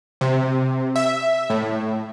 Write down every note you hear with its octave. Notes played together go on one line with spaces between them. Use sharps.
C3
E5
A2